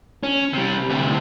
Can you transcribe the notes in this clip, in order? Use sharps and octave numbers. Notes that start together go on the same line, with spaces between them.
C#4
C3 G3
D2 C3